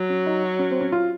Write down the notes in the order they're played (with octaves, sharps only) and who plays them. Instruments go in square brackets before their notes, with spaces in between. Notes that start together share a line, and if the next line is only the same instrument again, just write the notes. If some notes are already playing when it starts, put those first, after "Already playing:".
Already playing: [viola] F#3
[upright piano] C#4
D#4
F#4
C#4
C4
C#4
F4